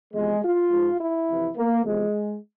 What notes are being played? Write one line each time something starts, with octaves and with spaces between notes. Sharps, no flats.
E2 C3 F3 G#3
F4
G#2 F3
E4
F2 C3 E3
A#3
E2 C3 F3 G#3